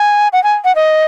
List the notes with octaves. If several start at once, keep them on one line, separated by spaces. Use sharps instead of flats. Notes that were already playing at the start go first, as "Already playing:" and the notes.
Already playing: G#5
F#5
G#5
F#5
D#5